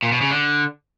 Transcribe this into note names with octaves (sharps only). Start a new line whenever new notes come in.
A#2
B2
C#3
D3